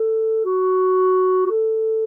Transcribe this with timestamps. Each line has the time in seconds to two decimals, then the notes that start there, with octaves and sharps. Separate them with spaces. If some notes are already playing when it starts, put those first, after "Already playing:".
Already playing: A4
0.45 F#4
1.46 F#4
1.50 A4